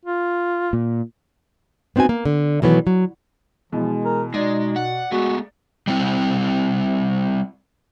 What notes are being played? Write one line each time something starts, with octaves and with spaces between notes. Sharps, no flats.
F4
A#2
B3 C4 D#4 F#4 G#5
A#3
D3
B2 D#3 E3 F#3 A3 B3
F#3
B2 E3 F3 G#3
A#4
B2 G#3 D#4 D5
F#5
G#3 A3 B3 F#4
G3 C4 E4